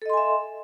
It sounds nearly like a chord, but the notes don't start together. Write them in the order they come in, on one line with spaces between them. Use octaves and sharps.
A4 D#5 C6 G#5 E5